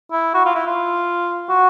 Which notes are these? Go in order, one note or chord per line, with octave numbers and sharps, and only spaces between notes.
E4
F#4
F4
E4
F4
F#4